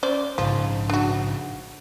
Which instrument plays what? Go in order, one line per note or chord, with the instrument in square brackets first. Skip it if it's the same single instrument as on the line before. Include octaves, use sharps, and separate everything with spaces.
[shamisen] C#4 C5 D5
[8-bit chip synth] A#1 G#2 C#3 [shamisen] F3
[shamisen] D4 F#4